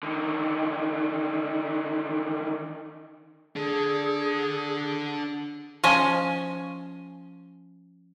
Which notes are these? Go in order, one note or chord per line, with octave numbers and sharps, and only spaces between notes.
D3 D#3
D4 G#4 A4
F3 C#4 D#5 G#5